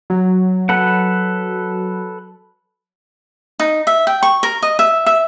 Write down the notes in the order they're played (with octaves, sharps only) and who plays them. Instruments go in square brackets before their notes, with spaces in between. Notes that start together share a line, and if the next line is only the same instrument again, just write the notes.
[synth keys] F#3
[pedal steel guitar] A4 B4 F#5
[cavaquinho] D#4
E5
G5
C#6
A#4
D#5
E5
E5